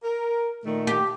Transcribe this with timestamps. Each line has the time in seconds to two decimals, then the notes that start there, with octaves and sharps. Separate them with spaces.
0.03 A#4
0.65 A#2 D#3 A3
0.87 G4